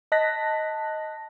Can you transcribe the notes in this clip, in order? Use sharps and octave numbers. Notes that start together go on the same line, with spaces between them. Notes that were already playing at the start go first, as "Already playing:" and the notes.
D#5 A5 F#6 A#6 B6